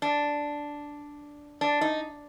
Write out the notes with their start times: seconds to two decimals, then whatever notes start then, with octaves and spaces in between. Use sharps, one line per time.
0.02 D4
1.61 D4
1.81 D#4